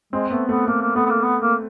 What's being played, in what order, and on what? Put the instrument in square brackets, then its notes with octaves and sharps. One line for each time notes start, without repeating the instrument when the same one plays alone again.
[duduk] G#3 [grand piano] C4
[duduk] A3 [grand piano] B3
[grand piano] A3 [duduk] B3
[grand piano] A3 [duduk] A#3
[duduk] A#3
[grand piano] A3 [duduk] B3
[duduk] B3
A#3
B3
A#3